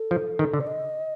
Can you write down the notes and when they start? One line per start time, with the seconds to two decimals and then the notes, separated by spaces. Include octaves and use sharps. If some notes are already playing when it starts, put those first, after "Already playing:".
Already playing: A4
0.11 F3
0.39 D#3
0.54 D3
0.60 D5
0.67 D#5